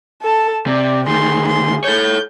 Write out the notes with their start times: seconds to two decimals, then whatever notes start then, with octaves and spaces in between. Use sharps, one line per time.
0.22 A4 A5
0.67 C3 D5
1.08 D2 D#3 G#4 C6
1.47 C6
1.84 A4 C#5 G6